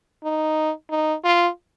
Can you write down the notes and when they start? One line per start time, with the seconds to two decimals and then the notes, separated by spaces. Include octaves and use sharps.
0.24 D#4
0.91 D#4
1.24 F4